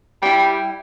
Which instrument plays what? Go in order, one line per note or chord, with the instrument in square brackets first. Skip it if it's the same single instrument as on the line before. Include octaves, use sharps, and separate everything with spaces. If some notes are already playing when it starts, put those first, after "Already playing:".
[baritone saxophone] G3 [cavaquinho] E4 G5